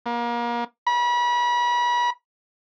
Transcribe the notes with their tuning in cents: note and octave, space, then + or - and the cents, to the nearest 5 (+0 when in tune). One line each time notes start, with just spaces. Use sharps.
A#3 +30
B5 -35